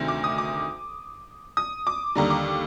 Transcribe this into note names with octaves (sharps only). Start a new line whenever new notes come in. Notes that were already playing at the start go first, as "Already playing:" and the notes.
Already playing: D2 C3 D#3
D6
D#6
D6
D#6
D6
D#2 D3 G3 A#5
D6